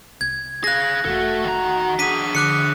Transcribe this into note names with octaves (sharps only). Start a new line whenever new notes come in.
C2 G#6
G#4 F5 F#6 A#6
E1 A3 F#4 A4
D#3 A#5
D4 G#4 B6 D#7
D3 D6 F#6 C#7